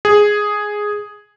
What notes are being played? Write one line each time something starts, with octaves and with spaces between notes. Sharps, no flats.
G#4